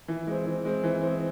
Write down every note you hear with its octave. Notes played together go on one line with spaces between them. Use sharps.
E3
G#3 C4
E3
G#3 C4
E3
G#3 C4